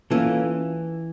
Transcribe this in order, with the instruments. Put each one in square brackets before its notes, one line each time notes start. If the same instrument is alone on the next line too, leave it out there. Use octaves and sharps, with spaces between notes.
[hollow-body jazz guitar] E3 [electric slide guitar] A#3 C#4 F4 A4